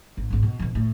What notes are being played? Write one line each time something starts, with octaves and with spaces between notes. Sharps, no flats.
A1
G#1 C4
B2
F2 B2
A2